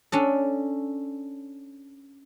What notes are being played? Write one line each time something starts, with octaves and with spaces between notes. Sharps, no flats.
C#4 D4 A4